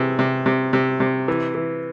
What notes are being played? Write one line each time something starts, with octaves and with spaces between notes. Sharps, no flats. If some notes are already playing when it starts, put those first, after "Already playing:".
Already playing: C3 E3 G#4
C3
C3
C3
C3
E3
E3